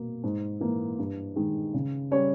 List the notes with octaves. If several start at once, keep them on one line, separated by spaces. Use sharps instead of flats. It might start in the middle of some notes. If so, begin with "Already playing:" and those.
Already playing: B2 A#3
G#2
E3 A#3
G2
D#3 G#3
C#3
G3 C#4 G4 C#5